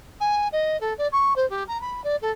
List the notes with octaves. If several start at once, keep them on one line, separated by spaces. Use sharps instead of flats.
G#5
D#5
A4
D5
C#6
C5
G4
A#5
B5
D5
A4